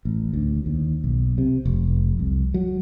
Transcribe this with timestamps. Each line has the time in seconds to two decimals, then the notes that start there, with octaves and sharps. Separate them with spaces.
0.05 A1
0.33 D2
0.66 D#2
1.04 B1
1.38 C3
1.66 F1
2.19 C2
2.54 F#3